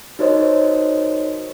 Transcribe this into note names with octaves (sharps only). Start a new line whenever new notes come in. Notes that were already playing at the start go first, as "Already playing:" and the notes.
D#4 F#4 A#4 C5 C#5 D#5